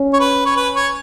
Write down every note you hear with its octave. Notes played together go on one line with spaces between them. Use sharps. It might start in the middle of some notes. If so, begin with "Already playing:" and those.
Already playing: C#4
C#5
B4
C#5
B4
C#5